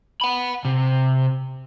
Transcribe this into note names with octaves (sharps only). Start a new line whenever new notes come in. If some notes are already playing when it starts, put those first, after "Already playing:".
F#5 B5
C3